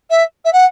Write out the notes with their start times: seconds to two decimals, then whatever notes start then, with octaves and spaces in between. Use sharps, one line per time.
0.10 E5
0.45 E5
0.53 F#5